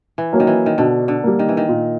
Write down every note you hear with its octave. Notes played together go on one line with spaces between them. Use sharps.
E3
F#3 A#3 C#4
D#3
E3
D#3
B2 D3
D3
G3 A#3
D#3
E3
D#3
A#2